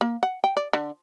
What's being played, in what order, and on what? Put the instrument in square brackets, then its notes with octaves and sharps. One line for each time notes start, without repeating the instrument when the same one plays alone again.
[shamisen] A#3
F#5
G5
D5
D3